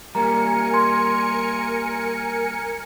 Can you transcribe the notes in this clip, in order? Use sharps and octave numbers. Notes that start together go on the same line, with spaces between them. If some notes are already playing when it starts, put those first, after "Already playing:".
G3 A#3 A#4 G#5 A#5 C#7
C6 G#6